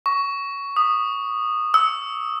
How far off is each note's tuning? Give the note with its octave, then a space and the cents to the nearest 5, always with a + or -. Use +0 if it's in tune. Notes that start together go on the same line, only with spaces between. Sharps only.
C#6 +15
D#6 -15
E6 -25